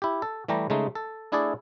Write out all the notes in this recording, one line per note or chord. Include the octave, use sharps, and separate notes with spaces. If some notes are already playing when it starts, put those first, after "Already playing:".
E4 G4
A4
E3 G3 A3 G4 A#5
C#3 G#3 A3 D#4
A4
A3 D4 E4 G#4 A4 D5